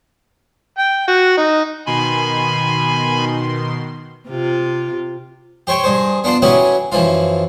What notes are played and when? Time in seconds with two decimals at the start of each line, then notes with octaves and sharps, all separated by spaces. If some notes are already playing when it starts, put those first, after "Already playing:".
0.78 G5
1.08 F#4
1.37 D#4
1.86 B2 D#3 G#5 B5 C6
4.29 C3 F4
5.67 G4 C5 C#5 G5
5.84 G2 G#4 C5
6.24 B3 D4 F4 C5
6.42 F#3 C#4 E4 G4 G#4 B4
6.92 F#2 E3 F3 F4